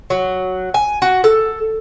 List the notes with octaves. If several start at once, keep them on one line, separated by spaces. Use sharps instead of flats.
F#3
G#5
F#4
A4